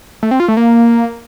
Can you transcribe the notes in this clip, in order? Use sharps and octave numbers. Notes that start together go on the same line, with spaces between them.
A3
C4
F4
A3
A#3